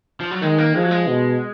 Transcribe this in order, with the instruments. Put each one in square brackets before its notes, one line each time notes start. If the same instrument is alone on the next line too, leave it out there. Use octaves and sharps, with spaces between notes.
[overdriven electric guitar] F3
F#3
[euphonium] D#3 [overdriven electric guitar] G#3
[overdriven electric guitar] A#3
[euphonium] F3 [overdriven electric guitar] G#3
[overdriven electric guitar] F#3
G#3
[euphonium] B2